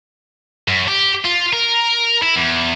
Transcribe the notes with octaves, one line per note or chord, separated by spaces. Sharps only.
F#2
G4
F4
A#4
E4
E2